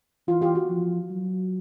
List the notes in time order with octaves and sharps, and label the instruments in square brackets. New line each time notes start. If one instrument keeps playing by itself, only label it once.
[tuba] E3 [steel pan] F4
[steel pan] F4 G4
F#4
[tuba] F3
F#3